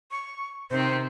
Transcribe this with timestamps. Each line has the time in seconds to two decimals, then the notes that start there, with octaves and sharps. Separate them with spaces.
0.11 C#6
0.71 C3 D#3 C4 C5